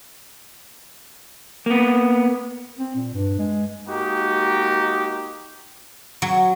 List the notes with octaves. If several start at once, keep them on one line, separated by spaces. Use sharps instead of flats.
A#3 B3
C4
A#2
G2
G#3
G#3 A#3 D#4 F#4 G4
F#3